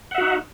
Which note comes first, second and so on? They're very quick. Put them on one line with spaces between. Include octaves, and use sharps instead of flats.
F#5 E5 F#4 D#4